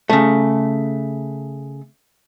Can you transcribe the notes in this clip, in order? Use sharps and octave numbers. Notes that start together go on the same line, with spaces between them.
C#3 A3